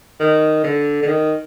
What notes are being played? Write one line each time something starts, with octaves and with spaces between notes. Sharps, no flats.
D#3
D3
D3
D#3